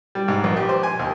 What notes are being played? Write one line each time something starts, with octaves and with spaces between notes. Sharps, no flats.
G3
G#2
A#1
G4
C5
G#5
D#2